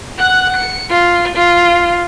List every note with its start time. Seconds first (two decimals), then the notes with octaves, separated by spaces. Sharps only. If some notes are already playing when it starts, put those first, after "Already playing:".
0.18 F#5 F#6
0.56 C#7
0.90 F4
1.35 F4